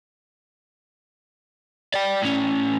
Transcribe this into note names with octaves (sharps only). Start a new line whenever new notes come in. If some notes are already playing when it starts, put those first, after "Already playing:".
D5 G5
A2 C#4